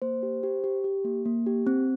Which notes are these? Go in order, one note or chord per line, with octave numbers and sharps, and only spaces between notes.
A#3 C5
G4
G4
G4
G4
A#3
A#3
G4
C4